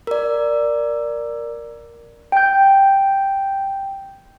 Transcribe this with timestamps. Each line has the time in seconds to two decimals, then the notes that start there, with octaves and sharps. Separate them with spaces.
0.07 A#4 D5
2.32 G5 G6